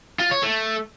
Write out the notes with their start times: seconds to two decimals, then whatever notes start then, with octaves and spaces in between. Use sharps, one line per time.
0.19 F4
0.31 C#5
0.43 A3